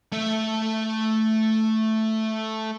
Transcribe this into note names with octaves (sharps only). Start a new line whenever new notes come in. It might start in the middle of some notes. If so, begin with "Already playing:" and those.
A3 E5